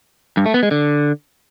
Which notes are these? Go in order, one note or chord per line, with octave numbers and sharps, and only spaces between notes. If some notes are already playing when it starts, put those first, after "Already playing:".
G2
A3
B3
G#3
D3